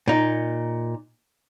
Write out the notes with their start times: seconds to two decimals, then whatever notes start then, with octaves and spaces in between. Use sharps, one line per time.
0.08 A#2 D#4